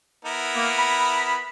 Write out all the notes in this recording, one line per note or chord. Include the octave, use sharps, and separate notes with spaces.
B3 E4 A#4
A#3
B5